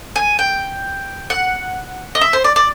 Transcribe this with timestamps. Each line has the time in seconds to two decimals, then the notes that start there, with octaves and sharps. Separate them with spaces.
0.16 G#5
0.39 G5
1.30 F#5
2.15 D#5
2.21 E5
2.33 C5
2.44 D5
2.56 D5